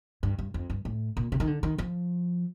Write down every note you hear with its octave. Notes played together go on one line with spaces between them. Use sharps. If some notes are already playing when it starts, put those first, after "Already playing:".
G2
G2
F2
G2
A2
A#2
C3
D#3
D3
D#3
F3